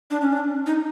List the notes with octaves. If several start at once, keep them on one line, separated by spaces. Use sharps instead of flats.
D4
C#4
D4
D#4